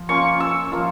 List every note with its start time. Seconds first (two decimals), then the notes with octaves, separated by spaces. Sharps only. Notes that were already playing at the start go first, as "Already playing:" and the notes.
Already playing: F3
0.09 A#3 C#4 F4 C#6
0.40 E6
0.72 F3 A#3 F4